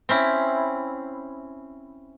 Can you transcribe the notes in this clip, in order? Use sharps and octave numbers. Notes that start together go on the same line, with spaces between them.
C4 C#4 E4